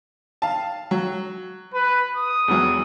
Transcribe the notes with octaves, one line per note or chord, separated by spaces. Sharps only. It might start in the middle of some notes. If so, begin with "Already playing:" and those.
F5 A5
F#3
B4
D#6
E2 E3 F#3